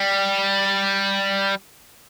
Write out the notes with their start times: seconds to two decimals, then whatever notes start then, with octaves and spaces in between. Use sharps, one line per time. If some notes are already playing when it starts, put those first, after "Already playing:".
Already playing: G3